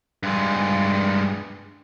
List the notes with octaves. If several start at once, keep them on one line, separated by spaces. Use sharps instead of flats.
G2 G#3